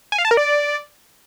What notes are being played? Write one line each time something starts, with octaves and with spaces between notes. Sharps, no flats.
G#5
F5
A5
A#4
D5